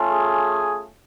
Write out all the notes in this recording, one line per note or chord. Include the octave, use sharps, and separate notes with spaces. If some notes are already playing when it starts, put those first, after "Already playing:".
Already playing: A3 C#4 F4
G#4